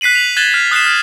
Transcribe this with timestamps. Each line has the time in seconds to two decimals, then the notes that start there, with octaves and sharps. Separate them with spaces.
0.01 F#6 B6 C7 D#7 F#7
0.15 F7 F#7
0.37 F#6 G#6 A6 E7 F#7 G7
0.54 F6
0.71 D#6 F#6 B6 C7 E7
0.86 F6